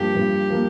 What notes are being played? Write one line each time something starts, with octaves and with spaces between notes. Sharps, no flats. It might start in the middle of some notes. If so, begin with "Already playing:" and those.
Already playing: G2 F3 A#3 G4
G2 F3 A#3
F3 A#3